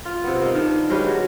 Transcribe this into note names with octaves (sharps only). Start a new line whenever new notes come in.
F4
C3 B3
A#3 D#4
D#3 D4
G#3 C#4 G4 B4
F#3